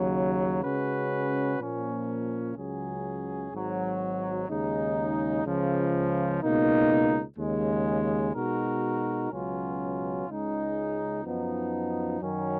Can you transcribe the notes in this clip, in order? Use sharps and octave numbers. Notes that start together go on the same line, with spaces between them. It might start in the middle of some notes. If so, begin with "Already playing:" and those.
Already playing: D#2 C#3 F#3
C#3 G#3 C#4 F#4 B4
A#2 F3 A#3 C#4
C#2 C#3 F#3 C#4 G#4
G#1 G#2 F#3
D#2 C#3 G#3 D#4
C#2 C#3 F3
C#2 B2 A#3 D#4
D#2 C#3 G#3
B2 G#3 D#4 F#4 A#4
C#2 B2 F#3 C#4 F4
C#2 C#3 G#3 D#4
F#2 F3 B3 D#4
F#2 D#3 F#3 C#4